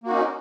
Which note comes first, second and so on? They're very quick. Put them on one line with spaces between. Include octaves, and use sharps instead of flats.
A#3 F#4 D#4 C#4